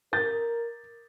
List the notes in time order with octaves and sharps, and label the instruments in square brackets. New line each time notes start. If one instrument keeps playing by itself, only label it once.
[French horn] A#4 [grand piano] G6 A6